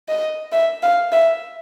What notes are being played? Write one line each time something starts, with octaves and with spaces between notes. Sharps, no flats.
D#5
E5
F5
E5